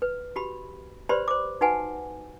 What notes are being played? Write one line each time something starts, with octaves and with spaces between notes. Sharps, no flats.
B4
F#4 G4 B5
G4 B4 C5 D5 B5 C6
C5 D6
D#4 F#4 B4 F#5 G#5